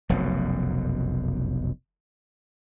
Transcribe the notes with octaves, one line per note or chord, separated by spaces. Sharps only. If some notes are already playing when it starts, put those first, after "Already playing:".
F1 B1 F#2 B2